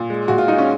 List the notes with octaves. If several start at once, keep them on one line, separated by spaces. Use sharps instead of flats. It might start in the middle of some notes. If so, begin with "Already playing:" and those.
Already playing: A#2
G#3
A#2 F#4
F4
G#3 D#4
C#4